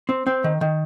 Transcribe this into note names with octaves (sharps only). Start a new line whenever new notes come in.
C4
C4
D#3
D#3